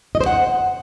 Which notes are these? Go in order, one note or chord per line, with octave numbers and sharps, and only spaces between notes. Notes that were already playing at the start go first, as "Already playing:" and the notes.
D#5
C5
F#5